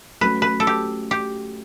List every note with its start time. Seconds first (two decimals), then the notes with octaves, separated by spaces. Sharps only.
0.21 F#3 A3 C#4 B4
0.42 B4
0.60 A4
0.67 G4
1.11 G4